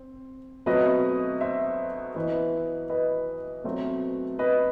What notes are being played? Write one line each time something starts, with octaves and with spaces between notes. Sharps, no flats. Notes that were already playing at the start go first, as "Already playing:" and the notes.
Already playing: C4
B2 F#3 A3 C4 B4 D#5
C5 E5
E3 B3 B4 D#5
B4 D#5
B2 F#3 A3 C4
B4 D#5